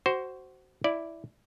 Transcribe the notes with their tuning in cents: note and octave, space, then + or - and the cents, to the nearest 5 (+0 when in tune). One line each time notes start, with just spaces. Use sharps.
F#4 +20 C5 +0
E4 +0 D5 +0